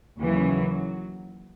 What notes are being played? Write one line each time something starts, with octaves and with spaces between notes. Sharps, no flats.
D#2 C#3 E3 F#3